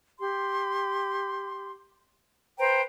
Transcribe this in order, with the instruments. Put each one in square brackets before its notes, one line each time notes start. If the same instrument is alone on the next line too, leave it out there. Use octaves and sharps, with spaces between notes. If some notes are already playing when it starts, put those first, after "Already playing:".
[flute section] G4 C6
B4 C5 G5 A#5